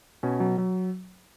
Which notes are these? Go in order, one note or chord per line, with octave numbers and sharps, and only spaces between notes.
B2 C#4
F#3
F#3